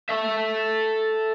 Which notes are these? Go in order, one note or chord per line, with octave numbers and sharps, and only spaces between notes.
A4 E5